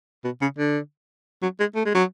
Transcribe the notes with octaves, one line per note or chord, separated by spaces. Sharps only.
B2
C#3
D3
F#3
G#3
A3
G#3
F#3